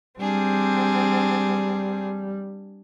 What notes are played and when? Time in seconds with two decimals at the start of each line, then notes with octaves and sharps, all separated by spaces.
0.20 G3 C4 D4 G#4